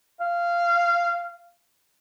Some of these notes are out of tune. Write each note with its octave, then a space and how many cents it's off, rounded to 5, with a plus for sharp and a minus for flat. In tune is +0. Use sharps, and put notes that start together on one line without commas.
F5 -15